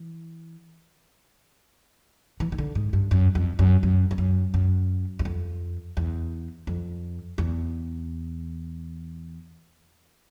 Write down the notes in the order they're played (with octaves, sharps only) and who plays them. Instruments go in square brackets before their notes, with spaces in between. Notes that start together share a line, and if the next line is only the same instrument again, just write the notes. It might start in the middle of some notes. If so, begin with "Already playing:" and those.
Already playing: [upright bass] E3
E3
D#3
D3
G#2
G2
F#2
F2
F#2
F#2
F2
F#2
F#2
E2
F2
E2
F2
E2